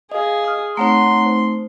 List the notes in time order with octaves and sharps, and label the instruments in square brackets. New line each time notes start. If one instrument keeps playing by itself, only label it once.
[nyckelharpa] G#4 [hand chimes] D#5 F5
[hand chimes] D#6 F6
[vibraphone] A3 C4 D#4 [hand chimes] C#5 F#5 A#5 [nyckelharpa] C6
[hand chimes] C5